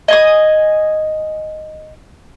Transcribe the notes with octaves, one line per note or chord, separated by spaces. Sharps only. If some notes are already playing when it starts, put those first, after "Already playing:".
D#5 G#5 D#6